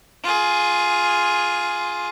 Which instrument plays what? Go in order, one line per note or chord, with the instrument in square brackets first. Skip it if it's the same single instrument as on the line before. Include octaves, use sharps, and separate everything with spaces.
[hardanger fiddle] F4 G#4